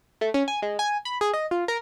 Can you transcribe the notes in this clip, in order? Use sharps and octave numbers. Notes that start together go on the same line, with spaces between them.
A3
C#4
G#5
G#3
G#5
B5
G#4
D#5
F4
A#4